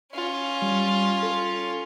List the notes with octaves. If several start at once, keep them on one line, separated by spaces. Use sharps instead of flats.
C#4 F4
G3
A4